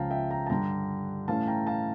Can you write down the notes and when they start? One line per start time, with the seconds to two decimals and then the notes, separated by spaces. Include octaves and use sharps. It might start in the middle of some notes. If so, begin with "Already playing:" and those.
Already playing: C#2 C#3 F3 F5 G5 A5 A#5
0.11 E5 G5
0.30 G5 A#5
0.46 A5
0.50 G2 D3 G3 G5 A#5
1.28 A2 E3 A3 C#4 F5 A5
1.47 G5 A#5
1.67 F5 A5